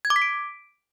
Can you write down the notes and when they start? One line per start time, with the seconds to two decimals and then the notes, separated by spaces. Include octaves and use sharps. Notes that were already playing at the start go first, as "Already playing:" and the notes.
0.05 G#6
0.10 D6
0.16 B6
0.22 D7